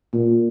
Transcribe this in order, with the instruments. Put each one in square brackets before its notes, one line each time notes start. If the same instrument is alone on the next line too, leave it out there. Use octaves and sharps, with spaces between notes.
[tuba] A#2